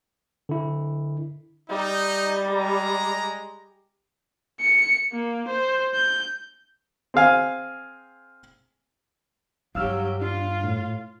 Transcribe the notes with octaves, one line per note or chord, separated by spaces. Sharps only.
D3 E4
G3 D#4
G#3 A#5
C#7
A#3
C5
G6
C4 G#4 F5 G#5
G2 F#3 G4 F5 E6 F6
D4 F4 F5
A2